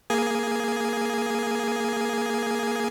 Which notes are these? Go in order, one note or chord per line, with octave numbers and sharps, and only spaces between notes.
A#3 G#4 G#5